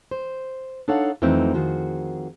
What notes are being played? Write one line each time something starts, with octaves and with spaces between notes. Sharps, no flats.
C5
D4 D#4 A4 C#5 F5 F#5
F2 E3 F#3 A3 C4 D#4
F2 D#3 F#4 G#4 C5